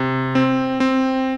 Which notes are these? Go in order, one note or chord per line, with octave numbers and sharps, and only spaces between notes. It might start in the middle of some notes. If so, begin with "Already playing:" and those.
Already playing: C3
C4
C4